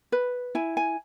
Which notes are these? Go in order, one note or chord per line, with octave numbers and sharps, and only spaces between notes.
B4
E4 G#5
G#5